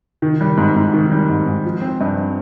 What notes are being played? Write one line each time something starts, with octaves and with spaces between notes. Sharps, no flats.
D#3
G3
G#2
G#2
D#3
G3
G#2
G#2
F3
C4
G2